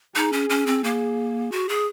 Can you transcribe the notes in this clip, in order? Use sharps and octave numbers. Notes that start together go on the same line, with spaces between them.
D#4 G#4
C#4
C#4
C4
A#3 G#4
F#4
G#4